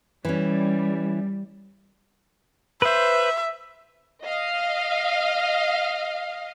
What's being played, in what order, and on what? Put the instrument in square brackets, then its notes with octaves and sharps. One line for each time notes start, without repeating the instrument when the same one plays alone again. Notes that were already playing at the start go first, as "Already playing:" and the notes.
[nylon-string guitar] E3 C#4 [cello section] G3
[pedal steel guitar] B4 C5 [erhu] E5
[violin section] D#5 F5